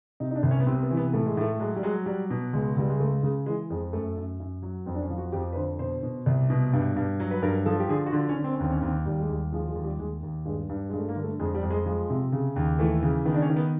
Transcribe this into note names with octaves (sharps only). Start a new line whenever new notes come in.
C3 D#4
D#4
D4
C2
C#4
B3
C3 C4
B3
E3
B3
A2 A3
G#3
A2 A3
F#3 G#3
G3
F#3 G#3
F#3 G3
B2
C#2 G#3
C#2 G3
G#3
C#3 A3
C#3 G#3
E3 G#3
F2 G#3
F#2 A3
F#2
F#2
F#3
F2 C4
D4
C#4
F3
F#4
F2 G4
B4
D3 C5
B2 C5
B2
C2
B2
G2
G2
F#3
B4
G2 A#4
F3 A4
G4
D3 G#4
F#4
D3 F4
C#4
D3
C4
C#4
D#2 C4
C#4
D#2 C4
D#2 G3
G#3
D#2 G3
F3 G#3
G#3
D#2
G3
D#2 G#3
D#2
G2 G#3
G2
G2 G#3
A3
A#3
D3
A3
F2 G#3
G3
F2
G#3
F3 G#3
C3
C#3
D#2
E3 A3
C#3
D#3 B3
D4
C#4
D#3
B3